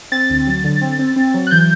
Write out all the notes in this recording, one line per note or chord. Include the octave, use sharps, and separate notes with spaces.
C4 A6
D2
F#3
D3
C4
C4
C4
F#3
F#6
E3 G6